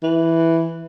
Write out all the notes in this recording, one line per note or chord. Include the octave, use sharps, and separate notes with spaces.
E3